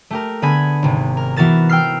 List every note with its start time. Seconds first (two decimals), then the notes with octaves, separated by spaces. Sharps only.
0.10 A3 G4 A#4
0.42 D3 B3 G#4 G#5 B5 G#6
0.83 G#1 C3
1.17 A#4
1.36 E3 B3 F#4 A#4 A6 E7
1.69 G5 E6 F6 C7